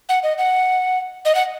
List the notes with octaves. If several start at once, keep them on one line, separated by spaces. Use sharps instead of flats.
F#5
D#5
F#5
D#5
F#5